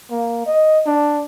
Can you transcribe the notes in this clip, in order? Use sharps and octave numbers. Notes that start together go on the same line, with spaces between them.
A#3
D#5
D4